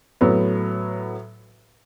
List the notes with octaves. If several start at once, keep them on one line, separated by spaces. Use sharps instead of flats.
A2 F#3 B3